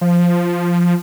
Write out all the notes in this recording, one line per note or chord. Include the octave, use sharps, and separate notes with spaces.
F3